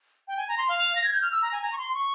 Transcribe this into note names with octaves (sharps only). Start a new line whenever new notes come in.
G5
G#5
A#5
C6
F5
A#6
G#6
G6
F6
E6
A#5
G#5
A#5
C#6
C6
C#6